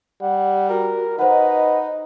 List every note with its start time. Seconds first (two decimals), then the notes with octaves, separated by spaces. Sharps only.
0.22 G3 F#5
0.69 F#4 A#4
1.19 D#4 B4 C5 D#5 F#5